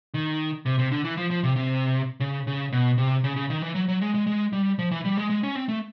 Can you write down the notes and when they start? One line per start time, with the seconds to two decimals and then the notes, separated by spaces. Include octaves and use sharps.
0.14 D#3
0.66 C3
0.79 C3
0.92 D3
1.04 E3
1.17 F3
1.30 F3
1.44 C3
1.56 C3
2.20 C#3
2.47 C#3
2.72 B2
2.98 C3
3.24 C#3
3.36 C#3
3.50 D#3
3.62 E3
3.75 F#3
3.89 F#3
4.01 G#3
4.14 G#3
4.27 G#3
4.53 G3
4.79 F3
4.91 E3
5.05 G3
5.17 G#3
5.30 G#3
5.43 C#4
5.55 C4
5.68 A3